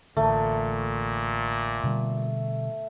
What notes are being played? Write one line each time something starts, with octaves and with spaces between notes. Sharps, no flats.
A1 A#2 D3 A3
B2 D3 G3